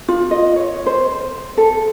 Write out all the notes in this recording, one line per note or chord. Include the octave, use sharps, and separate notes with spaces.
F4
D#5
C#5
C5
C5
A4